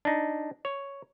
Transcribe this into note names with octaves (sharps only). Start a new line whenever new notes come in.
D4 D#4
C#5